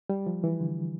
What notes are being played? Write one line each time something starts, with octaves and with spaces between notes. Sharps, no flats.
G3
F3
E3
D3